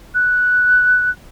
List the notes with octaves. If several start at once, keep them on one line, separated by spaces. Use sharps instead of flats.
F#6